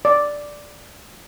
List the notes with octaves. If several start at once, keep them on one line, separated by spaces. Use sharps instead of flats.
D5